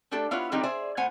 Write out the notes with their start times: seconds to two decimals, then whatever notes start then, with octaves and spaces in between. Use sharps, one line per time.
0.11 A3 D4 G4 A4
0.31 B3 E4 F4 B4 C#5 F5
0.52 D3 D#3 G3 C4 D#4 G4
0.63 G#4 C5 D5 E5
0.97 A2 B3 C5 F#5 G#5